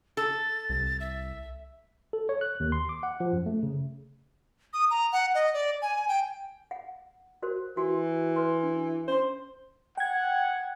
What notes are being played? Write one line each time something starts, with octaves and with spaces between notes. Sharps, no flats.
A4 A6
C2
E5
A4
C#5
F#6
D#2
C6
D6
F#5
F3
F#2
A3
C#3
D#6
A#5
F#5
D#5
D5
G#5
G5
F#5
F#4 A#4 C5
E3 F#4
B4 C6
D4
C#4 C5 C6
F#5 G5 G#6